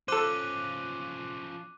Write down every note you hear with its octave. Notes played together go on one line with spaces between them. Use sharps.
F3 C#4 A4 C5 D6 F#6 D#7